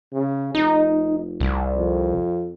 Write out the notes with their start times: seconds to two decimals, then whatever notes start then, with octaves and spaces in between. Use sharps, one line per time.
0.13 C#3
0.55 F1 D#4
1.40 C2
1.75 F2